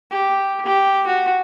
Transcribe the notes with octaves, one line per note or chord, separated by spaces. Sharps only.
G4
G4
F#4